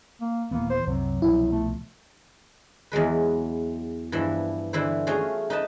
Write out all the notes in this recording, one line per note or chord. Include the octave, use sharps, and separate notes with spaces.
A#3
D#1 E3 A#3 B3
C5
C2 F#2 C3 F#3
C2 B2 F3 E4
A3
E2 F#3 G#3 B4
G2 E3 F3 E4
D3 E3 E4 C5
A3 C#4 F4 F#4 G#4
D#4 B4 A5